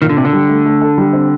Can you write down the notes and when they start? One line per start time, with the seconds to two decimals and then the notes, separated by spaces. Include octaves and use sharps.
0.02 A#2 D#3
0.09 D3
0.17 C3 D4
0.25 D3
0.33 G3
0.49 A3
0.65 A3
0.81 A4
0.98 G3
1.13 C4